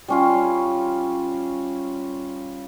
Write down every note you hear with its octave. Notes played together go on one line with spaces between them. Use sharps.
G3 C#4 F4